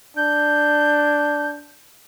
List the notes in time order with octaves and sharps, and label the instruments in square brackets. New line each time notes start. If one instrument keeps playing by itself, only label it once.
[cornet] D4 [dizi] G6